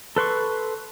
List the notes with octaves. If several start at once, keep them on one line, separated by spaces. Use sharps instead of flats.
A4 B4 C6 C#6